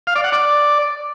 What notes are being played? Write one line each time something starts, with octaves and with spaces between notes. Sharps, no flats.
F5
D5
F#5
D5